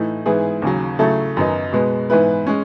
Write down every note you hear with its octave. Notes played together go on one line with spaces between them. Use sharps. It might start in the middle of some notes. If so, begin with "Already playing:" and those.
Already playing: A2 E3 A3 D#4
G#2 E3 B3 E4 G#4
D#2 C#3 F#3
C#3 F#3 A3 E4 A4
F#2 D#3 F#3 B3 D#4
B2 G#3 B3
G#2 E3 B3 E4 B4
G#3 C#4